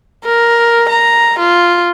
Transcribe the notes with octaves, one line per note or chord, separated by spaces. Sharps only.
A#4
A#5
F4